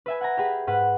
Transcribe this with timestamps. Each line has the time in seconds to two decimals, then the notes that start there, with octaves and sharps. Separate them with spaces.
0.06 B4 E5 G#5
0.21 F#5 G#5 A#5
0.37 G4 G#4 B4
0.67 G#2 B4 F#5